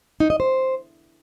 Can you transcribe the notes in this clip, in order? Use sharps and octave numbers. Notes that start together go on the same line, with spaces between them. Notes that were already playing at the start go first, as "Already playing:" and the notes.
D#4
D#5
C5